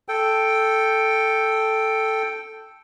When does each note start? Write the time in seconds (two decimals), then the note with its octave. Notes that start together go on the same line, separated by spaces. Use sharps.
0.08 A4 G5